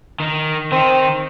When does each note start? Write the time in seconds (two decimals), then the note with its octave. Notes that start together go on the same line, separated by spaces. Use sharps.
0.20 D#3 D#4
0.72 D#3 C4 D#4